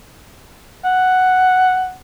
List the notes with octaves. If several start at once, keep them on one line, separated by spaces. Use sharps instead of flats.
F#5